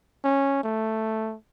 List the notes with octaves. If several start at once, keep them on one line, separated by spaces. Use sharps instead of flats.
C#4
A3